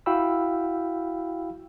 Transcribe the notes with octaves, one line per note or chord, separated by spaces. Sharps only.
E4 F#4 F5 G5 B5 E6